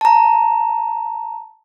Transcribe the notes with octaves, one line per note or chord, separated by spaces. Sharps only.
A5 A#5